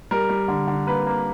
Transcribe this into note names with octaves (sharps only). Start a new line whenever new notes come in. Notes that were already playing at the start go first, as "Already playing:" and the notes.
G3 A#4
G3
D3
D3
A#3 B4
A#3